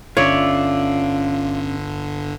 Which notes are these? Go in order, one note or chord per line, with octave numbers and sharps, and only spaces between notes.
G1 D3 C#4 F4 C#5 D5 E5